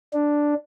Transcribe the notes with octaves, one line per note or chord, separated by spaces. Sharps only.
D4